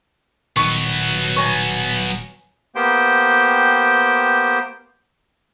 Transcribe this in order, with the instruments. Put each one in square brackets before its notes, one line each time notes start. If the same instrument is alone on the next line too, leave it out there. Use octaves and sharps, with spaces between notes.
[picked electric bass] D#1 D#3 [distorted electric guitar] F#3 B3 [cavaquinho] C#6
[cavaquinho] C#5 G#5 A#5
[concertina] A#3 B3 G4 C5 G5